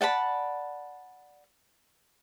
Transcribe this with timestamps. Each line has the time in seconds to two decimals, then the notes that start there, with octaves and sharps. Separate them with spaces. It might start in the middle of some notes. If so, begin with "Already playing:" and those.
0.01 D5 F#5 A5 B5